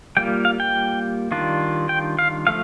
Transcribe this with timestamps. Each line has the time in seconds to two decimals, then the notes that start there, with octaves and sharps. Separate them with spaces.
0.17 G3 A#3 F4 G5
0.45 F5
0.60 G5
1.31 D#3 G3 D4 F4
1.89 G5
2.19 F5
2.47 F3 A3 F5